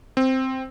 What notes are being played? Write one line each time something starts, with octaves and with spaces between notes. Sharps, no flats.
C4